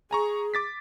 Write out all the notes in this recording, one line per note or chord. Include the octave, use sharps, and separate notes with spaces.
G#4 G#5 A#5 C#6
D6 A6 B6